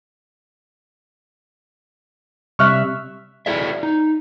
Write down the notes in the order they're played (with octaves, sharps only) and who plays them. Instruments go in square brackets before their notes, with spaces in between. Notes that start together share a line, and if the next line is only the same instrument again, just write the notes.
[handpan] C3 G3 E5 [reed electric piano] C#6 F6 F#6
[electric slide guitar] E4 F#4 G#4 A4 D5 E5
D#4